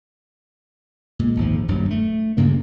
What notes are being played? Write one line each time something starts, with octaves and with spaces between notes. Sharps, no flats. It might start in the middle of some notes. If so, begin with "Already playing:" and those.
A#2 G#3
G#1 D#2 F3
D#1 G2 F#3
A3
D2 G2 C#3 A#3